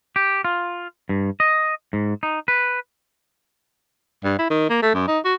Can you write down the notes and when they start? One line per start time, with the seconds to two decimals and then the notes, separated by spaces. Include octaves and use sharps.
0.16 G4
0.45 F4
1.09 G2
1.40 D#5
1.93 G#2
2.23 D#4
2.48 B4
4.24 G2
4.39 E4
4.50 D#3
4.70 A#3
4.83 A3
4.95 F#2
5.08 D#4
5.25 F#4